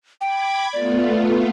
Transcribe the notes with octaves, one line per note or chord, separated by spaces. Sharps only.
G5 B5 D6 G#6
A3 B3 F4 D5